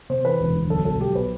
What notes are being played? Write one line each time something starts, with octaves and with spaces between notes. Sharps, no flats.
C3 C5
E3 B4
E1
D2
B1 A4
B2 A4
B1 G4
B2 B4